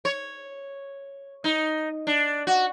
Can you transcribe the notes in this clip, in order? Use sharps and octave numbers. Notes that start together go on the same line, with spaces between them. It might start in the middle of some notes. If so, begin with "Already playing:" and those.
C#5
D#4
D4
F#4